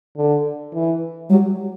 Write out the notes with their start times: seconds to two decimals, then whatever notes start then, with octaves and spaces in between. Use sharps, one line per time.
0.17 D3
0.74 E3
1.30 F#3 G3